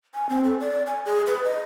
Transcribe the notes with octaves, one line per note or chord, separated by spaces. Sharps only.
G#5
C4
A4
D5
G#5
G#4
B4
D#5